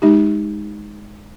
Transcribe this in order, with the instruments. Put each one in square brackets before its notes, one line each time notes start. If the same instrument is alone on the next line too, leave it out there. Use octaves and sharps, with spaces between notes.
[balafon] G#3 D#4 G4